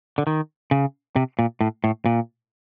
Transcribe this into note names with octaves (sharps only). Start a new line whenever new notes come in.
D3
D#3
C#3
C3
A#2
A2
A2
A#2